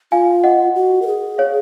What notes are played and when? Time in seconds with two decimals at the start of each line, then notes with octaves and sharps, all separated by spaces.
0.12 F4 F5 G#5
0.44 D#5 F#5
0.75 F#4
1.02 A#4
1.07 G#4
1.38 C#5 F5